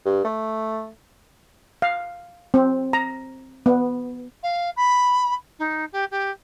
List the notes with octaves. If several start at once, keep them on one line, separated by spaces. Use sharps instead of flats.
G2
A3
F5
C4
A#5
B3
F5
B5
D#4
G4
G4